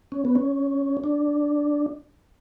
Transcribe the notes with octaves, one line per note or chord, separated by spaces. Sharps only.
C#4
B3
C#4
D4